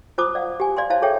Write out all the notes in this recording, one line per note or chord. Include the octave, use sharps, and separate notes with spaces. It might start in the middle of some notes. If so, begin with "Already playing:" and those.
F4 C5 A5 D6 D#6
D5 F5 F#5
G4 G#5
D5 F5 G#5 C6
E4 C5 C#5 F5 A5
G#4 A4 C#5 E5 G5